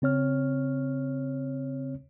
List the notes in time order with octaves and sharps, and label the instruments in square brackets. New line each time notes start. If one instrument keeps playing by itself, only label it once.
[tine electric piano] C#3 C4 C#5 F6